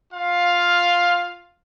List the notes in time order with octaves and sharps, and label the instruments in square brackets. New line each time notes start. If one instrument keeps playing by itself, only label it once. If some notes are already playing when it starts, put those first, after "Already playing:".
[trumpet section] F4 F5